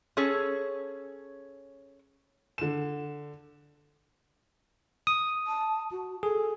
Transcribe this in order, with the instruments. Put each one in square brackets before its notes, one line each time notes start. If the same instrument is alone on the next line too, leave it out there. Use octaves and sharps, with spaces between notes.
[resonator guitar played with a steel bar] C#4 G#4 A4 C#5
[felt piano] D3 E7
[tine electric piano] D#6
[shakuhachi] A5
F#4
[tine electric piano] G#4 [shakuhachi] A4